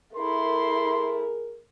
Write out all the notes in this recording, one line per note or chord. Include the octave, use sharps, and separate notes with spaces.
A3 E4 G#4 A#4 C6